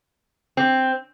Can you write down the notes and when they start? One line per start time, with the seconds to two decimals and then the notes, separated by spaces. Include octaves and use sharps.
0.57 C4